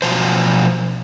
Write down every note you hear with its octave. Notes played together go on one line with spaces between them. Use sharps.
B2 F3 F#3 C5